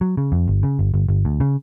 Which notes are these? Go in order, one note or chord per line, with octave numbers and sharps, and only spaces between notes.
F#3
C#3
F2
G1
C#3
G1
G1
G1
D2
C#3